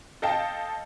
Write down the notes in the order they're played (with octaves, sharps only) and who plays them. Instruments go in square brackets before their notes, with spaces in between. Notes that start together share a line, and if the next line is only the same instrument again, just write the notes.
[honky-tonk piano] A4 D#5 F5 G5 A5